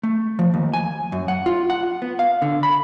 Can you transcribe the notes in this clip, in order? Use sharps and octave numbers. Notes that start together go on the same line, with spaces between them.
A3
F3
D#2
G#5
F#2
F#5
F4
F#5
B3
F5
D3
B5